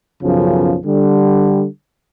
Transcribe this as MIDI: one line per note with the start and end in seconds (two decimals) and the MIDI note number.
0.23 0.77 35
0.23 0.77 42
0.23 0.77 49
0.23 0.77 53
0.85 1.65 50
0.85 1.65 55